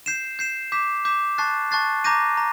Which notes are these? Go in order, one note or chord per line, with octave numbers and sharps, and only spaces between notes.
G6 C7 E7
G6 C7 E7
D6 G6 B6 E7
D6 G6 B6 E7
A5 C#6 F#6 A6 C7
A5 C#6 F#6 A6 C7
A#5 D6 G6 A#6 D#7
A#5